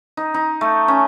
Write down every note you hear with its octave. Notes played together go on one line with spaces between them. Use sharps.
D#4
D#4
A3
C#4